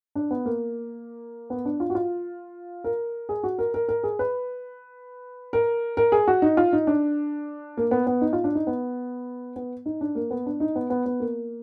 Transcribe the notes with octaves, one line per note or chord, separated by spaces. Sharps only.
D4
B3
A#3
B3
D4
F4
F#4
F4
A#4
G#4
F#4
A#4
A#4
A#4
G#4
B4
A#4
A#4
G#4
F#4
D#4
F4
D#4
D4
A#3
B3
B3
D#4
F4
D4
D#4
B3
B3
D#4
D4
A#3
B3
D4
D#4
B3
B3
B3
A#3